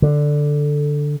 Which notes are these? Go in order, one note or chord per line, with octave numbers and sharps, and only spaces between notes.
D3